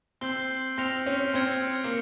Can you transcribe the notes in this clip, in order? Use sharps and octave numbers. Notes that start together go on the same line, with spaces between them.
C4 E6 G6 C7 G7
C4 F6 A#6 C#7 F7
C#4
C4 F6 G#6 C#7
A#3